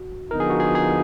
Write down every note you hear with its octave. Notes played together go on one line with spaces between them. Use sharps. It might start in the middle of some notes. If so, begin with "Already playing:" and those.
Already playing: F#4
D3 F3 B3 D#4 A#4
G#4
F#4
G#4
G#4